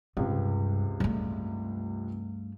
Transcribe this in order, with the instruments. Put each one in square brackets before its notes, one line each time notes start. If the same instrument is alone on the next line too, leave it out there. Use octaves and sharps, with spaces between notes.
[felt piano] C#2 C3 [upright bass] G2
[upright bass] G2 A3